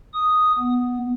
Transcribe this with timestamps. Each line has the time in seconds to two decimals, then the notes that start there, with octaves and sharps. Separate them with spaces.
0.13 D#6
0.59 B3